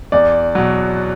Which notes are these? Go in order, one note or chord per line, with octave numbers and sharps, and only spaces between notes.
E2 D5
B2 F#3